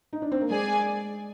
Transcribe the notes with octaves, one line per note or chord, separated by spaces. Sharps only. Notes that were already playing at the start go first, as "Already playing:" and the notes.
D#4
D4
C4
A#3
G#3 G#4 D5 G#5